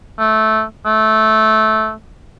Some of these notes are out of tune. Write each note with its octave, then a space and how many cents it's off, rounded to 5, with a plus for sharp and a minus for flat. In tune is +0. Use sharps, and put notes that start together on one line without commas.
A3 -10
A3 -15